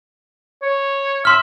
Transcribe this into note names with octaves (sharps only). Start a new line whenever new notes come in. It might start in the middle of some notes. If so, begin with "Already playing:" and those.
C#5
E5 C6 F6